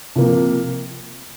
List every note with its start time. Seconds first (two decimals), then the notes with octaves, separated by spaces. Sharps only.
0.16 C3 F3 A#3